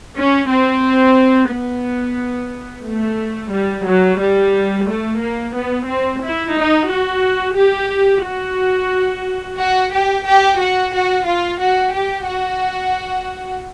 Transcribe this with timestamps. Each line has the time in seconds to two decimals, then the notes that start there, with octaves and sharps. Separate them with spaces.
0.16 C#4
0.49 C4
1.51 B3
2.85 A3
3.52 G3
3.87 F#3
4.20 G3
4.87 A3
5.21 A#3
5.55 B3
5.88 C4
6.22 E4
6.55 D#4
6.89 F#4
7.56 G4
8.24 F#4
9.58 F#4
9.92 G4
10.26 G4
10.60 F#4
10.94 F#4
11.27 F4
11.61 F#4
11.94 G4
12.27 F#4